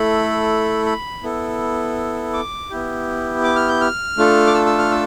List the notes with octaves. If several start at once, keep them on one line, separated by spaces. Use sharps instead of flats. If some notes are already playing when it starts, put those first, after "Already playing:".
Already playing: A3 E4 A4 B5
B5
B3 E4 A4
D6
B3 E4 G4
D6
F6
G6
F6
A3 D4 F4 A4
D6
E6
E6
F6
E6